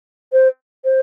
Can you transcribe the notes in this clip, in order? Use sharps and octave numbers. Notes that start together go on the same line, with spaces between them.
C5
C5